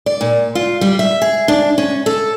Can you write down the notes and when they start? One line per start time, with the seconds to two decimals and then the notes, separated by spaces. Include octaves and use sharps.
0.06 D5
0.21 A#2
0.55 F4
0.81 G3
0.99 E5
1.22 G#4
1.48 D4
1.78 C#4
2.06 A4